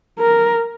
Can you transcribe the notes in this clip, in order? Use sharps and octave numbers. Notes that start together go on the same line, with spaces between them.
A#4